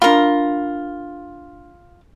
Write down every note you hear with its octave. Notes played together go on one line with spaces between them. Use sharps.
D4 F4 A#4 A#5 B5